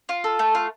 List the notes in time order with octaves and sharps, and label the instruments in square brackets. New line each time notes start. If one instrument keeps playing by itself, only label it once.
[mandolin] F4
A4
A3
F4